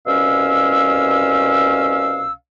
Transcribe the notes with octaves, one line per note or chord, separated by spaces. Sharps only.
C2 B2 C#4 F5 E6